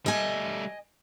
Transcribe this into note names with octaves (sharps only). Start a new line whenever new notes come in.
G3 A3 D#5 G#5